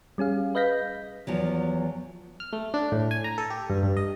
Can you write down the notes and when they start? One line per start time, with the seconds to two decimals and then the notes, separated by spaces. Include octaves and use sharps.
0.18 G3 C#4 G#4 F5
0.55 B4 D#5 F5 G6 A#6 B6
1.27 E2 F3 F#3
2.40 F6
2.53 A3
2.74 D4
2.92 A2
3.11 G#5
3.24 A#5
3.38 A4
3.50 G4
3.70 G2
3.83 G2
3.97 D#5